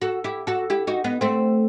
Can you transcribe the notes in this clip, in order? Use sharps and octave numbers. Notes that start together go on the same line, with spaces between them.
F#4 A4
E4 G4
F#4 A4
E4 G4
D#4 F#4
B3 D#4
A3 C4